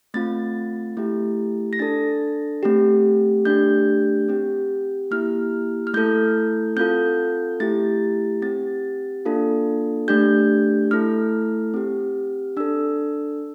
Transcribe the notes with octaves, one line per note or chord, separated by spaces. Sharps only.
A3 C4 F4 A6
A3 E4 G4
A#6
D4 A4 A6
A3 C4 G4
A3 D4 G4 G6
C4 G4
A#3 E4 G4 F6
F6
A3 E4 A4 G6
C4 F4 A4 G6
A3 E4 G4 A6
C4 G4 A6
A#3 D4 F4 A4
A3 D4 G4 G6
A3 E4 A4 F6
C4 G4
D4 A4 E6